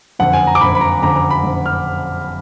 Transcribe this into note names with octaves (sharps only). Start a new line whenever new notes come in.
F#1 F2 D3 F#5
G#5
A#5
D6
F#1 F2 D3 B5
B5
A#5
F#1 F2 D3 A#5
A#5
B5
F#1 F2 D3
F6